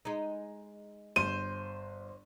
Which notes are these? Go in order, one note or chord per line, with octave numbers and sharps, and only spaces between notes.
G#3 D#4
G1 C5 C6 D#7